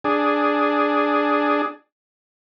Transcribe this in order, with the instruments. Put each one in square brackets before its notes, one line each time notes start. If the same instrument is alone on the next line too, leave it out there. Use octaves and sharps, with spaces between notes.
[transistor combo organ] D4 G#4